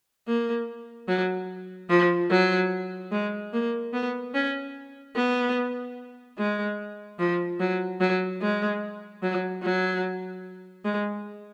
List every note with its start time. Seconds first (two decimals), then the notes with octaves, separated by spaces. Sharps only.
0.27 A#3
1.08 F#3
1.90 F3
2.31 F#3
3.12 G#3
3.53 A#3
3.93 B3
4.34 C#4
5.16 B3
6.38 G#3
7.19 F3
7.60 F#3
8.00 F#3
8.42 G#3
9.23 F#3
9.63 F#3
10.85 G#3